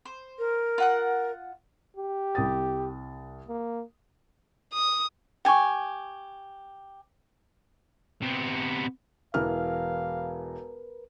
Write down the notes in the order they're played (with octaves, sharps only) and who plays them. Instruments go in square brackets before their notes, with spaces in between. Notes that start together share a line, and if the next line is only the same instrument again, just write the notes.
[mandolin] C5
[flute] A#4
[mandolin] F4 F#5 D#6
[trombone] G4
[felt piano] C2 D#6 A6
[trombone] A#3
[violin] D#6
[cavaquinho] G4 G#5 [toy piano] G5 C#6
[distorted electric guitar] C3 B3
[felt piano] E1 E3 F6 [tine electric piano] A#4 B4 [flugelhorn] F5